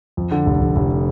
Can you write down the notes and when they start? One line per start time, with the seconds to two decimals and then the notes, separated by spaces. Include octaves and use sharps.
0.17 F2
0.31 D3
0.46 F1
0.61 F1
0.76 F1